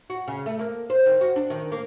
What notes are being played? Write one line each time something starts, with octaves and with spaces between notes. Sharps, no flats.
F#4
C#3
A3
A#3
C5
D#3
F#4
D4
D#3
A#3